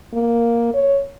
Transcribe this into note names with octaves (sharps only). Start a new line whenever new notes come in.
A#3
C#5